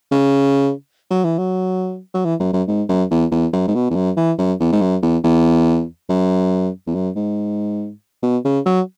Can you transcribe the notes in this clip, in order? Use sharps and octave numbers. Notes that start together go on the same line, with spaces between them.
C#3
F#3
E3
F#3
F#3
E3
F#2
F#2
G#2
F#2
E2
E2
F#2
G#2
B2
E2
F#2
E3
F#2
E2
G#2
F#2
E2
E2
F#2
E2
F#2
G#2
B2
C#3
F#3